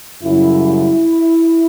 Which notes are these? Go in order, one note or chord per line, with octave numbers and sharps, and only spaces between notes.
F#2 C#3 G3 E4